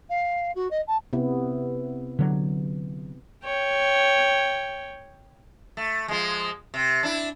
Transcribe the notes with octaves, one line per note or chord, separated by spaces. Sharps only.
F5
F#4
D#5
A5
C3 B3 E4
D3 F#3
C#5 G5
A3
F3 G#3
C3
D4 E4